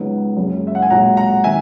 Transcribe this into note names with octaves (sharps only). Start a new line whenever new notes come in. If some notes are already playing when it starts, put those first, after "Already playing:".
Already playing: C#2 C#3 F#3 B3 D#4
F#1 F#2 C#3 G#3
E5
F#5
G#5
B1 A#2 G#3 F#5 A#5
F#5 A#5
D#3 E5 G#5